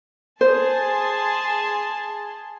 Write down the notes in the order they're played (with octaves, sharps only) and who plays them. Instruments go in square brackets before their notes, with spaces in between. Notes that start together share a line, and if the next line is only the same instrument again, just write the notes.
[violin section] G#4 A5 C6 [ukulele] C5